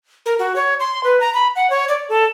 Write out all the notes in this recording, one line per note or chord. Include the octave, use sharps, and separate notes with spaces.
A#4
F#4
C#5
C6
B4
A#5
B5
F#5
C#5
D5
A4